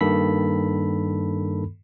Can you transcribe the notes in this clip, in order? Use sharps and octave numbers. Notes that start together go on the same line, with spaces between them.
G2 D#3 A#3 A4 B5 B6